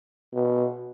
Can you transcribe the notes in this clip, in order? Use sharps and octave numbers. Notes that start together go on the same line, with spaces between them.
B2